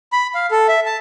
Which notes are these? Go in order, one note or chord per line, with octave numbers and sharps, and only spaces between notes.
B5
F5
A4
E5
A5